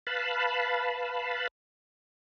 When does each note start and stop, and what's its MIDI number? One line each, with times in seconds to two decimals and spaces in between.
0.07 1.48 71
0.07 1.48 77
0.07 1.48 81
0.07 1.48 83